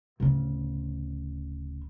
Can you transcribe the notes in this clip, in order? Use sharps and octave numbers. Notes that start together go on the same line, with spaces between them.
D1 C#3